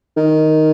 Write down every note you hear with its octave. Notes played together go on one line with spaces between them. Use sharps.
D#3